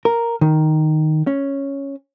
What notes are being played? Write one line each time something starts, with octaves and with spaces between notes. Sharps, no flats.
A#4
D#3
C#4